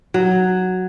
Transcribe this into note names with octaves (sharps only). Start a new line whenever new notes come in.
F#3